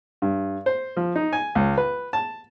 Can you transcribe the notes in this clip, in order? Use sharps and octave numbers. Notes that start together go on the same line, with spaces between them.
G2
C5
F3
D#4
G#5
C#2
B4
A5